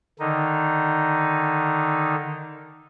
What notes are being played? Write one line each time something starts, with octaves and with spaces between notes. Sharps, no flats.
D3 D#3 D#4